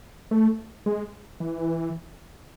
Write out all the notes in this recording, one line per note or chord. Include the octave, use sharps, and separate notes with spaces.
A3
G#3
E3